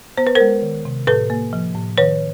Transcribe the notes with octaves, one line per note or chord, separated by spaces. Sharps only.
B3 C5
B4
G#3 A#4 C5
D#3
C3
A2 A4 B4
A#3
F3
A2
D#3 B4 C#5